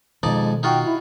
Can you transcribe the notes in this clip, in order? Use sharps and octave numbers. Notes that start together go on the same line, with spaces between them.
F2 B2 D#3 G#3 D#4 D5
D#4 F4 F#4 G5
E4